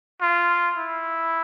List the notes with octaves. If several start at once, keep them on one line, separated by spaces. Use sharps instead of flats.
F4
E4